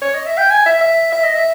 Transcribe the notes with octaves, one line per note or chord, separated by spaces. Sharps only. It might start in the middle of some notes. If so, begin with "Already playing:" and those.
C#5
D#5
E5
G5
G#5
E5
E5
E5
D#5
E5